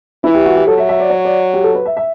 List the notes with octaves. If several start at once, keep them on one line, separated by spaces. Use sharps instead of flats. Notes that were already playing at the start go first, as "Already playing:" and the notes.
E3 E4
G4
F#4
G4
F#3 A4
E5
E5
D5
C#5
D5
G4
A4
B4
E5
E5